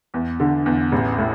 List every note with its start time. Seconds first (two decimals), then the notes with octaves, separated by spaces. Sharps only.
0.14 E2
0.40 D3
0.66 E2
0.92 A1
1.18 A2